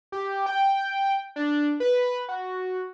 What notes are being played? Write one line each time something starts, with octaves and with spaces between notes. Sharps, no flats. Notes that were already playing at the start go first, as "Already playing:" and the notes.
G4
G5
D4
B4
F#4